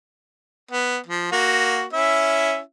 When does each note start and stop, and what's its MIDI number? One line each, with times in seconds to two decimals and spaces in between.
0.71 0.97 59
1.07 1.29 53
1.32 1.84 58
1.32 1.84 66
1.93 2.59 61
1.93 2.59 64
1.93 2.59 76